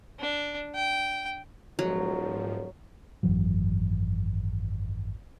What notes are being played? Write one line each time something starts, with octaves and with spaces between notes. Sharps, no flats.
D4
G5
D#1 G#2 F3 F#3
G#1 F#2 E3 F#3